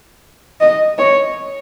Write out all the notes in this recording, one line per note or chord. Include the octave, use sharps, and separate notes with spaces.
D#5
C#5